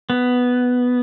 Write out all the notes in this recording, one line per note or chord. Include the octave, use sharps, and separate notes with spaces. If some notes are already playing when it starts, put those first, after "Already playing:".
B3